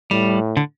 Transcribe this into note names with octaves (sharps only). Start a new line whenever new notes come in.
A2 G3
D3